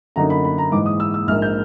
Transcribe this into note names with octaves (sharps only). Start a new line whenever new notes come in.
F#2 D3 F#3 A#3 D#4 A#5
B5
B5
A#5
G#2 E3 G#3 D6
D#6
E6
E6
A#1 G#2 F3 A#3 F6
G6